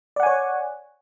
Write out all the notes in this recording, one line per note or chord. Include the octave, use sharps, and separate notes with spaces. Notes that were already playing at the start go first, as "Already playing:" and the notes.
C#5 D5 F#5 G#5